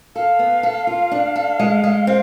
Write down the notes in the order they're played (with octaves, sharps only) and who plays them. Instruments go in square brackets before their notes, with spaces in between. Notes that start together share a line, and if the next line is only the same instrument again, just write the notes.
[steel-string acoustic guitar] A4 [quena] F5
[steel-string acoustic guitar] B3
A4
F4
D4
A4
G#3
G#3
C4